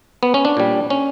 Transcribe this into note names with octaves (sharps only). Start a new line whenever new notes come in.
B3
C#4
D4
A#2 G3
C#4